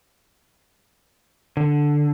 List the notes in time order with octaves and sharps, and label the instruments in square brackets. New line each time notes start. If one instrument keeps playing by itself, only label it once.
[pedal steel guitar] D3